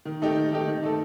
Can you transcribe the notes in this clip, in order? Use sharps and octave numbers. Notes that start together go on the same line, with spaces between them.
D#3
A3 D#4 G4
D#3
A3 D#4 G4
D#3
A3 D#4 A4